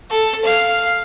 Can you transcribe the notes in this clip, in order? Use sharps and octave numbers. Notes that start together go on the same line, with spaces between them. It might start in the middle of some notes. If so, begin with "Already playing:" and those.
A4
F5